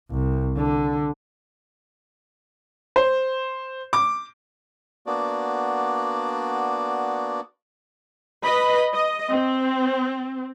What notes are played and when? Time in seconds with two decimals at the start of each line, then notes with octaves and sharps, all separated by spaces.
0.10 C2
0.56 D3
2.96 C5
3.93 D6
5.06 A#3 B3 D4 F#4 D5
8.41 B4 D#5 B5
8.93 D#5
9.31 C4